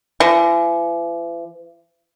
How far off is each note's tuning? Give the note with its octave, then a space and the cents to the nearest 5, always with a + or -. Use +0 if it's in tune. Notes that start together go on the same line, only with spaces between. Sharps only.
E3 +45